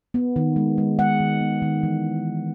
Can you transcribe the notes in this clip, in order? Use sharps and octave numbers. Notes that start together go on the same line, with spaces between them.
B3
D#3
G#3
G#3
G#3 F#5
D#3
B3
D#3
E3